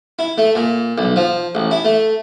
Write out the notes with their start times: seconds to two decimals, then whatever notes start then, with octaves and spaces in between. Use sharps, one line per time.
0.19 E4
0.38 A3
0.55 A#2
0.98 B1
1.16 F3
1.55 A1
1.71 E4
1.85 A3